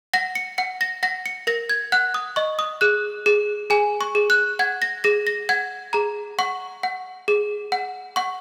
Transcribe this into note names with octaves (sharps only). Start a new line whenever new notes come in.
F#5 A#6
C#7
F#5 C#7
A#6
F#5 A#6
C#7
A#4 A#6
G#6
F#5 F#6
D#6
D#5 C#6
D#6
G#4 F#6
G#4
G#4 G#5
C#6
G#4
F#6
F#5 G#6
A#6
G#4 A#6
A#6
F#5 G#6
G#4 A#5
F#5 C#6
F#5
G#4
F#5
F#5 C#6